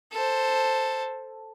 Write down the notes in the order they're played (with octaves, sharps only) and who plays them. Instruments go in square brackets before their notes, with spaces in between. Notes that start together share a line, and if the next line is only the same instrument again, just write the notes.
[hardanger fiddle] A4 C5